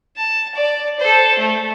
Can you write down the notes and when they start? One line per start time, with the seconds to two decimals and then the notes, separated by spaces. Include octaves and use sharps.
0.17 A5
0.55 D5
1.00 A4 C5
1.39 A3